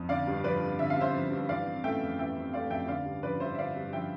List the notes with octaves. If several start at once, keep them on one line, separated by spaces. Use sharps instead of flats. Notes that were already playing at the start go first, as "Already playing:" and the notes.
Already playing: F2
D3 D5 F5
G2
F3 B4 D5
G2
D3 E5
F5
G2 C5 E5
F3
G2
E3 D5 F5
C4
A3 E5 G5
F2
E3 E5 G5
C4
A3 D5 F5
F2 E5 G5
D3 D5 F5
G2
F3 B4 D5
G2 C5 E5
E5
D3 D5 F5
G2
F3 E5 G5